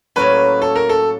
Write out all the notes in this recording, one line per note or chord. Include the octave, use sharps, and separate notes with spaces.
A2 F#3 A#3 C#4 B4
A4
A#4
A4